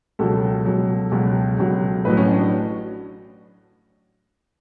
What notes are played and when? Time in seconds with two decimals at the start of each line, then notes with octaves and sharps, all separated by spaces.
0.19 C#2 B2 F#3 A4
0.65 C#2 B2 F#3
1.12 C#2 B2 F#3
1.59 C#2 B2 F#3
2.05 A1 A2 F#3 B4
2.17 C#4
2.29 D4